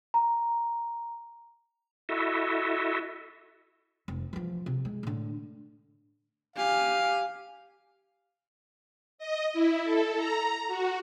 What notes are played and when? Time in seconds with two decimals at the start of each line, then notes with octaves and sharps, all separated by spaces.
0.14 A#5
2.09 E4 F#4 A4 D#5 E5
4.08 F1
4.33 E3 F3
4.66 C3
4.85 G#3
5.03 A2 D3
6.56 G4 F5 G#5
9.18 D#5
9.53 E4
9.84 A4
10.18 A#5
10.68 F#4